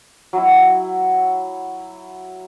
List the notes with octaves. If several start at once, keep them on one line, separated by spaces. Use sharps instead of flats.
F#3 E4